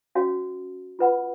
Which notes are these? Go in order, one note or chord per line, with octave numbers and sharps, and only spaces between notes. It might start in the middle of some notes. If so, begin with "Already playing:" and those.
C#4 F#4 C#5 F5
F4 B4 F#5 B5